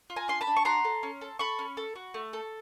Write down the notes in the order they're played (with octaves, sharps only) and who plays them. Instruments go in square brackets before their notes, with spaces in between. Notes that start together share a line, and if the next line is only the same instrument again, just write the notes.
[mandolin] F4
G#5 A#5
D4 C6
A5 B5
D4
C#6
F#4 A#5 C6
A4
C#4
A4
A4 B5 C#6
C#4
A4
F#4
A3
A4